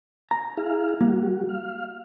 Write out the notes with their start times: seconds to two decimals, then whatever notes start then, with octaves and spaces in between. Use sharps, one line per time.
0.31 A#5
0.57 E4 G#4 F5
1.01 G3 A#3 F#4
1.49 F5